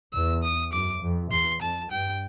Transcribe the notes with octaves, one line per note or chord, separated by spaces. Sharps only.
E2 E6
D#6
F#2 D6
F2
E2 C6
F2 A5
G2 G5